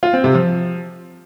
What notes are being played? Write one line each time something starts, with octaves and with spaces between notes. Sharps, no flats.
F4
C4
C3
F3